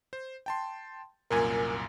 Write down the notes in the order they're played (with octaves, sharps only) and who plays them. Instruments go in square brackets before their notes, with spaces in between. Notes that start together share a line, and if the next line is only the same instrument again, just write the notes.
[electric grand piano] C5
G5 A5 C6
[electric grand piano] C2 F#2 A#2 [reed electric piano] A#4 G#5